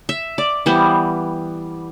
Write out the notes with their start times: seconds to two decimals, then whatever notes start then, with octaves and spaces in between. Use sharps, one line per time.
0.09 E5
0.38 D5
0.66 E3 G3 B3 C5